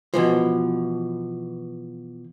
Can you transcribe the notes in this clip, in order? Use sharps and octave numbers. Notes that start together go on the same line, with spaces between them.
B2 E3 F3